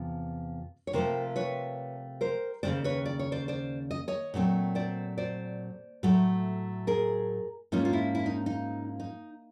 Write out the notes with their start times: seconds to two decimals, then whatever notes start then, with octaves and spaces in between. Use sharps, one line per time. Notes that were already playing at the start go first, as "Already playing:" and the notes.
Already playing: E2 C3 F3
0.87 C#5
0.93 C3 F3 A3 A#4 C5
1.36 B4 C#5
2.21 A#4 C5
2.63 D#2 C#3 E3 G#3 C5 D5
2.84 B4 C#5
3.05 D5
3.19 C#5
3.32 C5 D5
3.48 C5 D5
3.91 D#5
4.08 C#5 D#5
4.34 A#2 F#3 A3 C4
4.75 C5 D5
5.18 C5 D5
6.03 A2 F#3 A3
6.87 G#4 A#4
7.72 G#2 F3 A#3 C#4 D#4 F4
7.85 F4
7.93 E4
8.15 E4
8.26 D#4
8.46 D#4
9.00 D#4